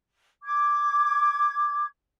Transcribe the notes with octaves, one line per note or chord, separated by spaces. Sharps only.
D6 G#6